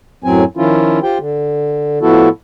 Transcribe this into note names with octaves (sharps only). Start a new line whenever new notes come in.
F#2 A2 F#3 C4 G#5
D#3 F3 C#4 E4 F4
F4 G4 C5 G5
D3
A2 F3 B3 E4 F#4 A4